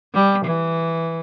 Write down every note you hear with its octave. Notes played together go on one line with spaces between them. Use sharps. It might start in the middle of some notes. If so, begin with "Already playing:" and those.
G3
E3